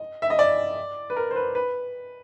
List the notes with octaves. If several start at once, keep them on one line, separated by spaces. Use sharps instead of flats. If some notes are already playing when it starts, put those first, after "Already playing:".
Already playing: D#5
E5
D#5
D5
B4
A#4
C5
B4
B4